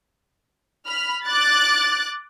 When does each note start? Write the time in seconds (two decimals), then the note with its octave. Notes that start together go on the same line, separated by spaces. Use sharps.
0.87 B5 F6
1.26 D6 F#6 A6